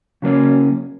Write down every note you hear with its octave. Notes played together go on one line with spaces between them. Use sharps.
C#3 F#3 A#3 C#4